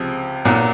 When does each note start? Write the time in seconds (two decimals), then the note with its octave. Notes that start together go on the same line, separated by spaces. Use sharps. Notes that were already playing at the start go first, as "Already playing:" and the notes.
Already playing: C#2 C3 F3
0.45 B1 A#2 F#3